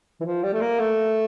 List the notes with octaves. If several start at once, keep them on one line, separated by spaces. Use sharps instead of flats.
E3
F3
G3
A3
A#3
A3